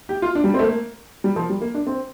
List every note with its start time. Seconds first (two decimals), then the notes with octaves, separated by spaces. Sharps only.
0.09 G4
0.22 F4
0.35 D4
0.44 G3
0.54 C4
0.59 A3
0.63 A#3
1.24 G3
1.36 F3
1.50 G3
1.61 A#3
1.74 D4
1.87 C4